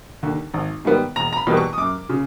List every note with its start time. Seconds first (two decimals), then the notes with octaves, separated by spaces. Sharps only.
0.23 D#2 D3
0.54 G#1
0.85 G#2 D#3 G3 B3
1.16 E1 A#5
1.33 A#5
1.37 B5
1.47 E2 B2 G3 B3
1.57 C#6
1.73 D#6
1.78 F#2 D6
2.09 C#3